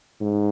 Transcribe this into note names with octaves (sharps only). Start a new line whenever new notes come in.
G#2